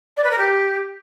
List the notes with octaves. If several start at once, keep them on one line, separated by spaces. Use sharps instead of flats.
D5
B4
A#4
G4